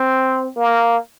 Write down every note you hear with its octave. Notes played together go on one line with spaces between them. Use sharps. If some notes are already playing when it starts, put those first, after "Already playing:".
Already playing: C4
A#3